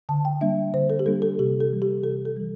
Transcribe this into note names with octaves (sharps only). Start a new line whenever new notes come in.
D3 A5
G5
G3 A#3 D4 E5
D3 C5
A4
G4
G3 A#3 D4 A4
A4
C3 G4
A4
E3 G3
G4
C3 A4
A4
E3 G3